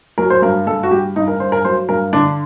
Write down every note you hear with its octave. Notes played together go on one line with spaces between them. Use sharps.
F#3 A#4
C5
G2 A#4
G2 A4
F#4
G2 G4
G2 D#4
A#4
G2 C5
A#4
F#3 C5
G2 A#4
D3 D4